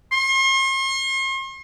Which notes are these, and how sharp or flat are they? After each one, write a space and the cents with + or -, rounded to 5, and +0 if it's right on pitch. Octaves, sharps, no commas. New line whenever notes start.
C6 +45